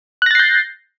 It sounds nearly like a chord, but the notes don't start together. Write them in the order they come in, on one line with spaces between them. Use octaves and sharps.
F#6 A#6 A6 C7 G6